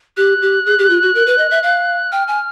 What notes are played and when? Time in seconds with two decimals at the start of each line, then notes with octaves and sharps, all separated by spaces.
0.17 G4 F#6
0.42 G4
0.66 G#4
0.79 G4
0.90 F4
1.02 F#4
1.15 A#4
1.27 B4
1.38 D#5
1.51 E5
1.63 F5
2.12 G5 F6
2.28 G#5